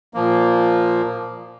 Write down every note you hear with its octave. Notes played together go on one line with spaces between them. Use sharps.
A#2 F3 A#3